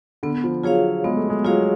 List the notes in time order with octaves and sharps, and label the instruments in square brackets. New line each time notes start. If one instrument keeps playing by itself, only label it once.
[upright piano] D3 [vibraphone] B3
[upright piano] F3
[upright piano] F#3 [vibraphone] F4 G#4 C#5 F5
[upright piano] G#3 [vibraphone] B3
[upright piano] A3
G#3
[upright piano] F#3 [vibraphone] F4 G#4 C#5 F5